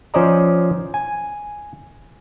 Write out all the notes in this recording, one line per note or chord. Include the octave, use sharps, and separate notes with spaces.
F3 C#4 C5 D5 D#5 A#5
G#5